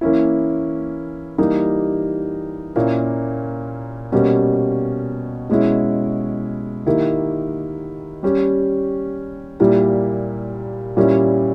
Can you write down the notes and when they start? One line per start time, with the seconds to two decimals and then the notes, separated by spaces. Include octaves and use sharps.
0.01 E3 A#3 C#4 E4
1.38 E3 G3 A#3 D#4 G4
2.76 A#2 A#3 C#4 E4
4.12 B2 G3 A#3 C#4 G4
5.49 B2 G#3 C#4 E4
6.86 D#3 A#3 E4 G4
8.23 G3 C#4 G4
9.60 A#2 G3 A#3 E4 G4
10.97 A#2 G3 C#4 E4 G4